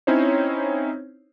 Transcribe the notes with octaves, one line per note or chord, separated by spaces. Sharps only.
C4 C#4 D#4 E4 C5 C#5